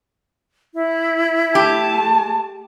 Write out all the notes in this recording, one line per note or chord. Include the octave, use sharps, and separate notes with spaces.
E4
A3 G4 A5